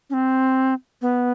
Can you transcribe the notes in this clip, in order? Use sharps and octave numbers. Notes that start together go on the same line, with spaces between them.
C#4
C4
B3